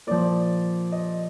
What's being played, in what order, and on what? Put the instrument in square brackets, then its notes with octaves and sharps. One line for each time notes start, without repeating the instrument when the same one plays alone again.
[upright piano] A#2 F3 D5
D#5